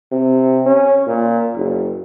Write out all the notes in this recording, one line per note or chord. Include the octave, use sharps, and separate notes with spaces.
C3
C#4
A#2
F#1